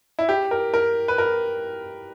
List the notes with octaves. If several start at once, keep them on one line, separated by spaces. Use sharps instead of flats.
E4
G4
A#4
A#4
B4
A#4